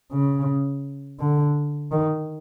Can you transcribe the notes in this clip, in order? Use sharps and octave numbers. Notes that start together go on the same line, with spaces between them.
C#3
D3
D#3